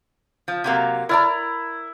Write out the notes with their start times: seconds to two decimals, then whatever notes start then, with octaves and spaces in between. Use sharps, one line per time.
0.48 F3
0.64 C3 F#3 A#3
1.09 E4 A#4 D5 A#5